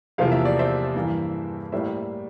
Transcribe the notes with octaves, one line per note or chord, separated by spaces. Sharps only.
E2 C3 F3 A#3 F5
E5
D5
C5 E5
G2 E3 A#3
A2 G3 A#3 C5 E5